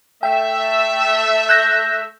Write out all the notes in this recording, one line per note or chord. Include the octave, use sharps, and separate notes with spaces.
A3 E5 G5
F#6 G6 A#6